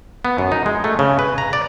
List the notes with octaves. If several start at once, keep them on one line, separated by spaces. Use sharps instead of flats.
B3
F#2
D#4
G#3
A3
C#3
B4
A#5
D5